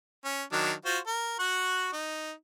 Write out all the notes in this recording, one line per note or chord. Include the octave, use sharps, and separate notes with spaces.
C#4
D#3 F#3 D4
F4 F#4 C5
A#4
F#4 F#5 C#6
D#4